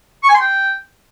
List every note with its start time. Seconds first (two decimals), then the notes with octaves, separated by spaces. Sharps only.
0.23 C#6
0.29 G#5
0.35 C6
0.40 G5